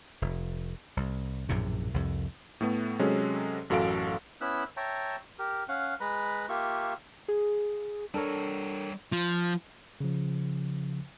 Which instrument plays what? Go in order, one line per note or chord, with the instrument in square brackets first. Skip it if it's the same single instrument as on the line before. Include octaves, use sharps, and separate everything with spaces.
[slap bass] F1
C2
A#1 F#2 A2 C3
C2 F2
[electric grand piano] A2 A3 B3
C3 F#3 G#3 C#4 G#4 A4
A1 F#2 F#4 A4 F5 D7
[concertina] B3 C#4 E4 B5 E6 F#6
C#5 E5 G5 A5 A#5
G4 A#4
C#4 F5 F#5
G#3 B4 A#5 B5
A#3 F4 G4 E5 C#6
[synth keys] G#4
[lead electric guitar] G3 C#5 [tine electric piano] D4 A4 A#4
[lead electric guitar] F3
[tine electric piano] C#3 F3